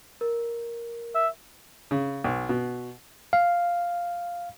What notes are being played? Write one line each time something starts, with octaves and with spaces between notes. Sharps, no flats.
A#4
E5
C#3
B1
B2
F5